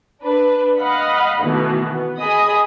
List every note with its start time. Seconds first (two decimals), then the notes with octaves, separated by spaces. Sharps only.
0.22 D4 B4
0.78 D#5 F5 F#5 B5
1.41 B2 D#3 E3 A3
1.87 B3
2.19 G#4 D#5 B5 D#6